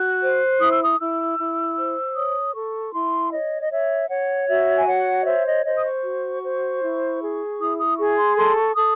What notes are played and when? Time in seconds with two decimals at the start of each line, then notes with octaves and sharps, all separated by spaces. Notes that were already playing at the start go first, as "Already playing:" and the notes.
Already playing: F#4 F#6
0.21 C5
0.60 E4 D#6
0.71 E6
0.82 D#6
0.99 E4 E6
1.38 E4
1.77 C5
2.15 C#5 D#6
2.54 A4 C#6
2.93 E4 C6
3.32 C#5 D#5
3.62 D#5
3.71 C#5 E5
4.10 C#5 F#5
4.48 F#4 E5
4.76 G#5
4.87 C#5 F#5
5.22 D#5
5.26 C5 E5
5.46 D#5
5.65 C5 D#5
5.76 D#6
5.84 C#6
6.04 F#4
6.42 C5
6.81 E4
7.20 G#4
7.59 E4 D#6
7.78 D#6
7.97 G#4 C#6
8.17 C6
8.37 A4 C6
8.56 C#6
8.75 A4 D#6